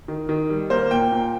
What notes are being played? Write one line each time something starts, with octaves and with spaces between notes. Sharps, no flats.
D#3
D#3
G3
A#3 C5
A#2 G5
A#2